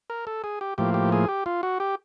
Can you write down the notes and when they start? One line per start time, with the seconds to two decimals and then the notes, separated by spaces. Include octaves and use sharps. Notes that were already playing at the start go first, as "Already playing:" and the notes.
0.10 A#4
0.27 A4
0.44 G#4
0.61 G4
0.78 A2 F3 A#3 G4
0.94 G4
1.12 G#4
1.28 G4
1.46 F4
1.63 F#4
1.80 G4